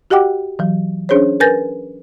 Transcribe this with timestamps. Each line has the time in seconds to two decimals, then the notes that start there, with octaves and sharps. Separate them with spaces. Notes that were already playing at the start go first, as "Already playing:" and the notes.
0.10 F#4 G4 D#5 F#5 G5 D6
0.59 E3 F#3
1.09 C#4 D4 G#4 C5 C#5
1.40 A#4 B4 G#5 G6 A6 A#6